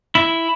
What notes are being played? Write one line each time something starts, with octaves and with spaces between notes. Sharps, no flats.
E4